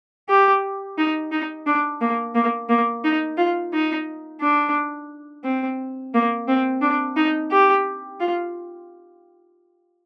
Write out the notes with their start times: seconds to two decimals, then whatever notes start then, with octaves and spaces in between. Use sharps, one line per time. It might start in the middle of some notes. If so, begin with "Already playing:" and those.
0.29 G4
0.98 D#4
1.32 D#4
1.66 D4
2.01 A#3
2.35 A#3
2.69 A#3
3.04 D#4
3.38 F4
3.73 D#4
4.41 D4
5.44 C4
6.14 A#3
6.48 C4
6.81 D4
7.17 D#4
7.51 G4
8.20 F4